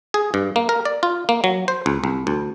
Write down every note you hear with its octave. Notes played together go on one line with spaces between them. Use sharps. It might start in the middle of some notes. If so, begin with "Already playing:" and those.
G#4
G2
A#3
A#4
D5
F4
A#3
F#3
C5
C#2
C2
D2